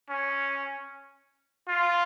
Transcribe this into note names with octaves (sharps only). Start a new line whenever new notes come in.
C#4
F4